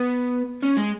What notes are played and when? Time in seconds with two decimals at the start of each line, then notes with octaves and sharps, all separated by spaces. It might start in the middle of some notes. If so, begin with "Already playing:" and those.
Already playing: B3
0.62 C#4
0.77 G#3